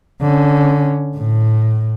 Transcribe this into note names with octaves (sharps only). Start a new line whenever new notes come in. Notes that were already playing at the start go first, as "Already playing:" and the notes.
D3 C#4
A2